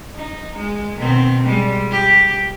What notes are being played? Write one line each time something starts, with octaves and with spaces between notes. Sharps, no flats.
D#4
G#3
B2 D#3 C4
G3 G#3
G4